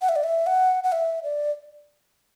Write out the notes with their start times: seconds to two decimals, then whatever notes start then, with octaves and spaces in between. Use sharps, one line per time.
0.02 F#5
0.09 E5
0.16 D5
0.24 E5
0.47 F#5
0.84 F#5
0.92 E5
1.24 D5